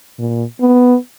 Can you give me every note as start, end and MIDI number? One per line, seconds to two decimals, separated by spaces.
0.19 0.44 46
0.60 0.96 59